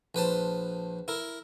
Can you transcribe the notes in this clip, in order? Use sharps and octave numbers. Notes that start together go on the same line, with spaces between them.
A#1 B4 C5 A5
E4 A#4